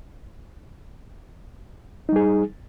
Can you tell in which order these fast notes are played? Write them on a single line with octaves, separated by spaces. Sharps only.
D#4 G3 G#4